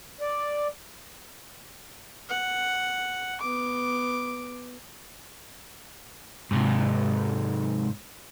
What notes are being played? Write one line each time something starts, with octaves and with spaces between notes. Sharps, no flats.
D5
F#5
B3 D6
G#2 C3